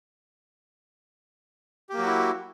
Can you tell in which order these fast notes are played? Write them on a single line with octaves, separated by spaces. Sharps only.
G4 A#3 F#3 F#4 E4